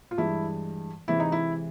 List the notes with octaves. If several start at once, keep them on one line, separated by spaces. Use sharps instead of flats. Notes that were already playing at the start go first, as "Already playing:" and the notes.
F4
G2 E3 G#3 E4
C3 E3 G#3 E4
D#4
E4